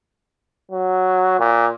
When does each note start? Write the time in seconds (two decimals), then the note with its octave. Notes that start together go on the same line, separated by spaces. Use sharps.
0.71 F#3
1.39 A#2